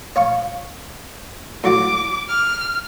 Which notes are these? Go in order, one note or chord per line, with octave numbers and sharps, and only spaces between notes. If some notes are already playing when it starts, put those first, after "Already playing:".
C#5 F5 C#6
A2 F#3 F#4 D6
F6